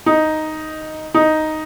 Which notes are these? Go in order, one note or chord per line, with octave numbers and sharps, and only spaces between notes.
D#4
D#4